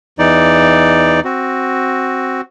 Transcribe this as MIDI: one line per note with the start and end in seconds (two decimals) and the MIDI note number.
0.19 1.20 40
0.19 1.20 52
0.19 1.20 63
0.19 1.20 74
1.24 2.41 60
1.24 2.41 66